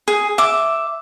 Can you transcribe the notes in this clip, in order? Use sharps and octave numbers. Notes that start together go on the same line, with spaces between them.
G#4
E5 D6